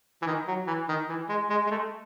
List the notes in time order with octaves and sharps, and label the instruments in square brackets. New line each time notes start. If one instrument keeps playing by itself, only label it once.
[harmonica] E3
D#3
F#3
E3
D#3
E3
G#3
G#3
G#3
A3